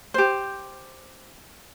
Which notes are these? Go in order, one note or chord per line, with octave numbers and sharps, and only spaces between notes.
G4 C5